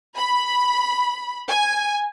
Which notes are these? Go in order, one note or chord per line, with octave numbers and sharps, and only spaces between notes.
B5
G#5